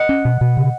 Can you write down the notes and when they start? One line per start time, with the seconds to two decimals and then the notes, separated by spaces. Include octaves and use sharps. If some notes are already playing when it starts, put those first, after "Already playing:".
Already playing: D#5 F#5
0.09 C#4
0.25 B2
0.41 B2
0.57 C#3